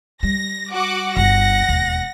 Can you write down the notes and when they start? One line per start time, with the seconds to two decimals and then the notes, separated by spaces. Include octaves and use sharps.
0.23 G3 A#6
0.73 F#4 F#5 D6
1.17 G1 F#5 A#6
1.69 E1 D#2